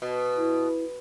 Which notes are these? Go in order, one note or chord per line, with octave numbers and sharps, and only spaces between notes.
B2
E4